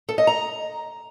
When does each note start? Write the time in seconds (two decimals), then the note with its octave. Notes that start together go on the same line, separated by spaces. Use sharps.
0.09 A4
0.18 D#5
0.27 A#5